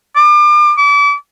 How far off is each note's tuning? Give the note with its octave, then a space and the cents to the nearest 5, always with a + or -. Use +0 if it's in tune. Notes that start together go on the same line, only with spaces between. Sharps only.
D6 +35
D6 -35